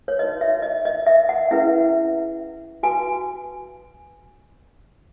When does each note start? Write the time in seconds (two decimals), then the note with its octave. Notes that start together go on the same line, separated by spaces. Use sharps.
0.08 C#5
0.19 D#4 F#4 B4 D#5
0.41 E5
0.62 D#5
0.85 D#5
1.07 E5
1.29 F#5
1.51 C#4 E4 G#4 B4 E5
2.83 F#4 B4 G#5